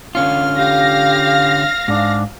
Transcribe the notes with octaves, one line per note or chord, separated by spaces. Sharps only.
D3 C#4 F4 F5 F6
G4 F5 A#6
G#2 D4